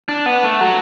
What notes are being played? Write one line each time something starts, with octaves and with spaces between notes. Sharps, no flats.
D4
B3
A3
F#3